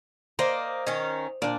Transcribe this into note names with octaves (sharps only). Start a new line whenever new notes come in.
A#3 C5 D5 D#5
D#3 C#4
A#2 D4 D5